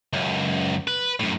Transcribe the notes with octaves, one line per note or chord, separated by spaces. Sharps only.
C#2 F#2
B4
F#2 A2